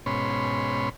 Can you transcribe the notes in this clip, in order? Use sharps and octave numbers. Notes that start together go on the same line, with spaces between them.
G#2 B2 C#4 C#5 B5 C6